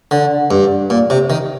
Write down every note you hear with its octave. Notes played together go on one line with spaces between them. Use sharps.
D3
G2
A#2
C3
D#3